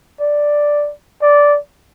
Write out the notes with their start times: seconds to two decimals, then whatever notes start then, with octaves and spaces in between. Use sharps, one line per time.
0.20 D5
1.22 D5